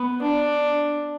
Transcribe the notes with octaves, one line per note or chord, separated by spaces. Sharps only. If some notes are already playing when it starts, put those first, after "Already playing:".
Already playing: B3
D4